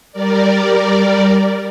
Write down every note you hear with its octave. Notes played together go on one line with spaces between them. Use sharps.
G3 A#4 D5